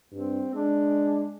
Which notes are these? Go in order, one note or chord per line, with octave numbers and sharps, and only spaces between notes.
G2 C4
G#3 D4